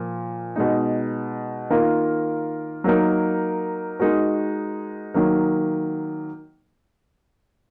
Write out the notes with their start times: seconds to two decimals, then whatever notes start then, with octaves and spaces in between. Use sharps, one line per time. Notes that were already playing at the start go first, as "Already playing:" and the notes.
Already playing: A#2 F3
0.56 B2 G#3 D#4
1.70 D#3 A#3 F4 A#4
2.84 F#3 A#3 D#4 A#4
3.99 G#3 D#4 F#4 A#4
5.14 D#3 F#3 A#3